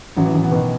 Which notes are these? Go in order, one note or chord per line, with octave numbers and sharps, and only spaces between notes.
A1 F#3
E3
A1
B3
B2 D#3